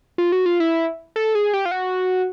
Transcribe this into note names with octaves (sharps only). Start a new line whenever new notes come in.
F4
F#4
F4
E4
A4
G#4
G4
F4
F#4